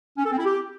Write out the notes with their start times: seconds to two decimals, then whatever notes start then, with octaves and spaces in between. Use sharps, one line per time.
0.18 C#4
0.25 A4
0.31 C4
0.38 E4
0.45 G4